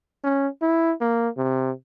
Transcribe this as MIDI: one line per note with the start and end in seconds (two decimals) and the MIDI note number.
0.24 0.47 61
0.62 0.92 64
1.01 1.29 58
1.37 1.71 48